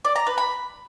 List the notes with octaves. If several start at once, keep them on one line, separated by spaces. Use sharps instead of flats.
D5
A#5
B4
B5